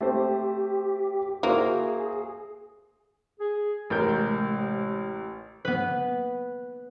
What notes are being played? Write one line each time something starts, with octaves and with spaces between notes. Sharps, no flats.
A3 C4 G4 C5
A#3 E4 F#4 G#4 C5
G#4
A1 C3 G#3 A#4 G6
B3 B4